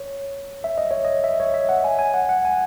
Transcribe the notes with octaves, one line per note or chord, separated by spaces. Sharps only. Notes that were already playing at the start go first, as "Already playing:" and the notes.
Already playing: C#5
E5
D#5
C#5
D#5
E5
C#5
E5
F#5
G#5
G#5
F#5
F#5
G#5